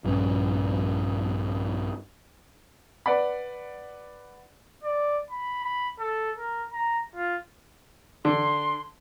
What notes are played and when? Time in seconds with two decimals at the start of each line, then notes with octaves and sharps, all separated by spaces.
0.04 A#1 G2 C#4
3.06 B4 D5 F#5 B5
4.84 D5
5.30 B5
5.64 B5
6.00 A4
6.38 A#4
6.73 A#5
7.16 F4
8.25 D3 C6